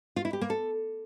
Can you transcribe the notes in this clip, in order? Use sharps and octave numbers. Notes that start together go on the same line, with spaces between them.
F4
E4
G4
A#3
A4